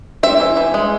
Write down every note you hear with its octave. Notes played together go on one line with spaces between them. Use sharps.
C4 E5
E3
E3
G#3